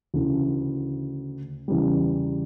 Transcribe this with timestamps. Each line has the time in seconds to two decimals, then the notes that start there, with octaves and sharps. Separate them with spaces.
0.14 D2 C#3 E3
1.68 E2 C#3 E3 G3